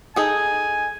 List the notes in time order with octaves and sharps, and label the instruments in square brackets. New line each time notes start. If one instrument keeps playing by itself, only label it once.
[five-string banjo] D#4 G#4 A4 [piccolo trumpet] G#5